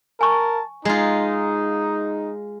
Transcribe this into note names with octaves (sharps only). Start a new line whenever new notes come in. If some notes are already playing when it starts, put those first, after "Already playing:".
A#4 G#5 A5 C#6
G#3 D#4 F4